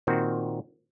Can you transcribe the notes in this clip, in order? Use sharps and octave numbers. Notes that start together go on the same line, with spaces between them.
A#2 D#3 C4 F#4